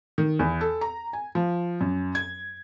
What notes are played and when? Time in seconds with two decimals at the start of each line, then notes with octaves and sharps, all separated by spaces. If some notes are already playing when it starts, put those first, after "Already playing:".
0.18 D#3
0.39 E2
0.61 A4
0.81 A#5
1.13 G#5
1.35 F3
1.81 F#2
2.15 G#6